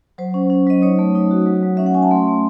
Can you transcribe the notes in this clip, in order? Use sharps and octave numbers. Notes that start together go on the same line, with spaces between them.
F#3 C5
C#4
C#4
F#3 D#5
D#4 C#5
A3
D#4
F#4
F#3
F#3
C#4 E5
F#5
C#4 G#5
A5
A3 C6
A3